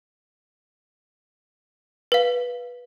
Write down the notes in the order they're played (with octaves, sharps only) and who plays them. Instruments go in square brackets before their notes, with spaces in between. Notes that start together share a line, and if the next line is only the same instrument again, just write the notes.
[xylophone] B4 F5